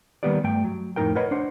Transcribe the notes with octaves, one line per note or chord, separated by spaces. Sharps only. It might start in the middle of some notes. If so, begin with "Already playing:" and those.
D#3 G3 A#3 B3 G4 D5
G2 A3 G5
F#3
F2 A2 C3 D#4 A#4 G5
A#4 B4 C#5 D#5 F#5 B5
D4 C5 F#5